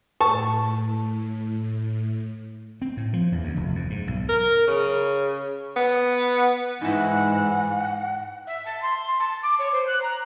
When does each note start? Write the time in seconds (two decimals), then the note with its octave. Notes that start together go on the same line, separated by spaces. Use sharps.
0.21 A2 A5 C#6
2.82 C4
2.97 A2
3.13 F3
3.32 E2
3.43 D2
3.57 F1
3.75 F2
3.90 G#2
4.07 B1
4.29 A#4
4.67 C#3
5.76 B3
6.82 G#2 E3 D#4 E4 F#5
8.47 E5
8.66 A5
8.82 C6
9.20 A5
9.43 D6
9.59 C#5
9.73 C5
9.87 F#6
10.02 A#5